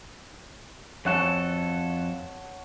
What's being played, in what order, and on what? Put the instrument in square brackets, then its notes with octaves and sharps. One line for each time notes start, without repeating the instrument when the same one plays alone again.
[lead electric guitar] F2 A4 [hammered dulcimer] C#5 F#5 A5